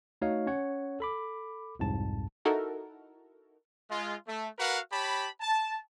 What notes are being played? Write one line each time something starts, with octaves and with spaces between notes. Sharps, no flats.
A3 D#4 F#4 C#5 D#5 F5
C#4 C#5 F#5
A4 B5 D6
C2 F2 G#2 A5
D#4 E4 F#4 A4 A#4
G#3 F4
A3
F#4 A#4 B4 F5 F#5
G4 C#5 A5 B5
A5